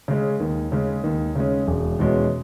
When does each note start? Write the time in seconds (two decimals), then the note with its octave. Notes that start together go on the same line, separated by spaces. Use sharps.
0.08 C#3 G#3 C#4
0.40 D#2
0.72 C#3 G#3 C#4
1.04 D#2
1.36 C#3 G#3 C#4
1.67 E1
1.99 E2 B2 G#3 C#4